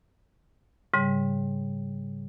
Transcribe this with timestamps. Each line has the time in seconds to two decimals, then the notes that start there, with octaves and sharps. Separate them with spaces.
0.94 G#2 C#3 G3